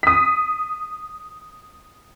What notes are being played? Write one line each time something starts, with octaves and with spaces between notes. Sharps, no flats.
D#6 B6